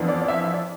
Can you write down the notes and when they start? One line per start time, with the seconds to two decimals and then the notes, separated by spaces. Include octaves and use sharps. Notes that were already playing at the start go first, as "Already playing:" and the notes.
Already playing: F2 E3 B3 D4
0.09 D5
0.22 D5
0.28 E5
0.42 E5
0.54 D5